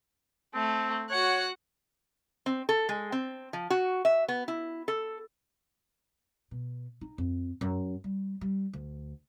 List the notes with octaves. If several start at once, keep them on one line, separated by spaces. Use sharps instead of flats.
A3 C4
F#4 C#5 F#5
C4
A4
G#3
C4
F3
F#4
E5
B3
E4
A4
B2
D#4
F2
F#2
G3
G3
D2